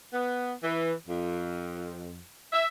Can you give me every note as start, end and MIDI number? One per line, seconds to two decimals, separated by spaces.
0.14 0.52 59
0.63 0.92 52
1.07 2.19 41
2.53 2.66 76